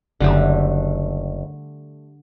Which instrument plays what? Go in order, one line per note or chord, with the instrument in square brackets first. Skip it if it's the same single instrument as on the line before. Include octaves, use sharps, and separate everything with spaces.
[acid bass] F#1 [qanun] D3 G3 A3